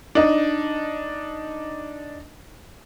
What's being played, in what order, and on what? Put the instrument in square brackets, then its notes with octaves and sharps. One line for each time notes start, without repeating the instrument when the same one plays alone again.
[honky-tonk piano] D4 D#4